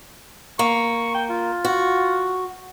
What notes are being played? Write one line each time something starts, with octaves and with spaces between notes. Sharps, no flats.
A#3 C#6
G5
F4
F#4